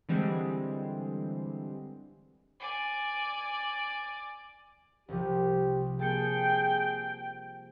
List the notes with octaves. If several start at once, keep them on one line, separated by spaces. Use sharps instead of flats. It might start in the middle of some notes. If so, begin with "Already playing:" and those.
D3 E3 G3 G#3 C4
D5 G#5
C2 C3 F3 G4
A#3 G#4 G5 A5 C#7